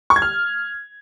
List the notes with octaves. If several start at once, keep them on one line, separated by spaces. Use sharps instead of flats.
C#6
G#6
F6